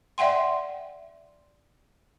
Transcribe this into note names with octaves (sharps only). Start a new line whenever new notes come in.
D5 E5 F#5 G5 C6